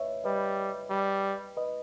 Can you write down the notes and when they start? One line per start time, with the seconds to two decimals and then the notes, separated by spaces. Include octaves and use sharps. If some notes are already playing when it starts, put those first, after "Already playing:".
Already playing: B4 C#5 D#5 E5
0.24 G3 B4 D#5
0.90 G3
1.57 B4 D#5